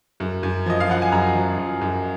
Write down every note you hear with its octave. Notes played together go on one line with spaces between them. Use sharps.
F#2
F#2
F3 D#5
F5
F3 F#5
G#5
F#2 A#5
F3
F#2
F#2